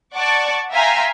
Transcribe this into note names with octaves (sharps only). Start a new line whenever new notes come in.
D5 F#5 A5 C#6 D6
E5 F5 G5 G#5 A#5 C6